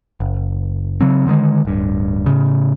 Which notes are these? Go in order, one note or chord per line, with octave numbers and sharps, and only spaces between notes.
F#1
C#3 F#3 C4
D3 D#3 G3 G#3
D1 G2
A2 C#3